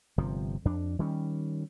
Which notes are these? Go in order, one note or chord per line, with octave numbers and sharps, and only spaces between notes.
G1 C3 F3
F2 D4
D#3 G3 C#4